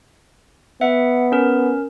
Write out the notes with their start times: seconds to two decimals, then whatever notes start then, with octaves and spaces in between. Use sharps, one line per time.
0.81 B3 E5 F#5
1.32 C#4 A#4